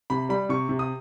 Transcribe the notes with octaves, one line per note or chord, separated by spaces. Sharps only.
C3 B5
G3 B5
C3 C#6
C3
D#6